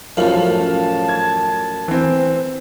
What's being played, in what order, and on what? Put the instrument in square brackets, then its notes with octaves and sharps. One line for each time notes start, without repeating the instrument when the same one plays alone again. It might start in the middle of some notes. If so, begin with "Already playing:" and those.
[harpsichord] A1 F#2 [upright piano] F3 [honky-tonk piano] C#4 F5 F#7 [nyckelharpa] A5
[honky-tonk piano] G#6
[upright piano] E3 C4